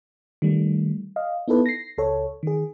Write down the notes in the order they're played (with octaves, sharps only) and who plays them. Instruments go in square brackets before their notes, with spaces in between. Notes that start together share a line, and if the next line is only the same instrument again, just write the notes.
[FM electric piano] D#3 G3 A3
D#5 F5
B3 D#4 E4 A4 B4
A#6 C7
C#2 A4 C#5
D#3 G#4